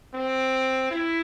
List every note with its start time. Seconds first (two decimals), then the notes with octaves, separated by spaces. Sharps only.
0.14 C4
0.91 E4